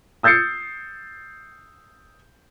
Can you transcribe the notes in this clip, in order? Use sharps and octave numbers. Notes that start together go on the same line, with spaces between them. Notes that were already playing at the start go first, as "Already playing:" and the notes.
D#6 E6 G6 A6 C7 C#7